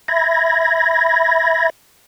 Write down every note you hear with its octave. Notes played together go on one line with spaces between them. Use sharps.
E5 B5 G#6 A#6